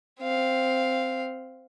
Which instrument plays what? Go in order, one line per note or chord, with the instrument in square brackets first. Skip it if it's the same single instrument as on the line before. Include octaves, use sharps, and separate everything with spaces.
[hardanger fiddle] C4 F5